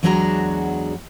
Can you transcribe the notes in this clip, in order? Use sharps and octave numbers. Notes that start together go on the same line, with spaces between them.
E2 F#3 G#3 D4 F#4 A#5